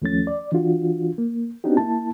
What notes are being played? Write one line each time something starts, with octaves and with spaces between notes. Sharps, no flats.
D#2 F3 A3 C#4 A6
D5
E3 D4 F4 F#4
A#3
B3 C4 D4 D#4 F#4 G4
A#3 E4 A5